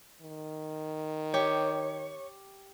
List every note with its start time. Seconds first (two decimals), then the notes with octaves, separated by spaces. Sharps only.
0.22 D#3
1.34 G4 C#5